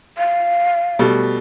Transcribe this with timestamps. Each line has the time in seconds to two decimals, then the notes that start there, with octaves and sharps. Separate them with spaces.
0.18 F5
0.99 B2 G3 A3